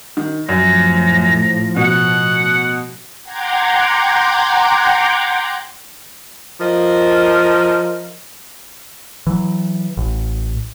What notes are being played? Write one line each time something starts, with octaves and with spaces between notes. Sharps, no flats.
D#3
F#2 A2 F3 A#5
B2 F#5
F#5 G5 A#5 C6 D6 G#6
F3 A#4 D#5
E3 F#3
A1